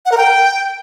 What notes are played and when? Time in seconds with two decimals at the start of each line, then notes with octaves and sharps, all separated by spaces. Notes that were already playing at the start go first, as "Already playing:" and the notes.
0.06 F#5
0.12 A#4
0.17 G5